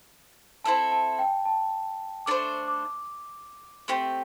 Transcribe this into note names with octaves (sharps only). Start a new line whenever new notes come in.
C4 E4 A4 E5 A5
A5
G5
A5
A3 D4 C5 D6
D6
A3 C4 G4